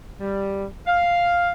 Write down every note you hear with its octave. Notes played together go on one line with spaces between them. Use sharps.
G3
F5